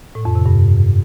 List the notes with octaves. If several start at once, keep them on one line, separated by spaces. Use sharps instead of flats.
A2
F2
C3
G2